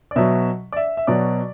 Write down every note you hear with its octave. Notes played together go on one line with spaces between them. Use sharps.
D5
B2 F#3 E5
D5
E5
E5
B2 F#3 D5